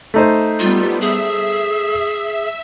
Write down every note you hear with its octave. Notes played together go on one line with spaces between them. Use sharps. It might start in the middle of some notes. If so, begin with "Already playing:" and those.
A3 D#4 C5
G3 B3 F4
G#4 E5